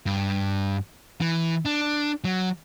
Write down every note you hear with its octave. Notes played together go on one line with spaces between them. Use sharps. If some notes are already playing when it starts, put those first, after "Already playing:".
G2
E3
D4
F#3